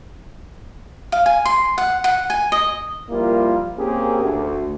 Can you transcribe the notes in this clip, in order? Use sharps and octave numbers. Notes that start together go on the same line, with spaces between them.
F5
G#5
C6
F#5
F#5
G#5
D#5
F3 G3 A#3 E4 F4 A#4
A#3 C4 C#4 G4 G#4 A#4
D2